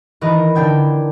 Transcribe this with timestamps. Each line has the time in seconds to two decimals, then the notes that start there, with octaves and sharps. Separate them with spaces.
0.21 D#3 E3 A#4 B4 D#5
0.55 D3 D4 G5 G#6